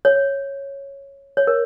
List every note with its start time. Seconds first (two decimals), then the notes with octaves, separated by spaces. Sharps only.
0.05 C#5
1.37 C#5
1.47 A#4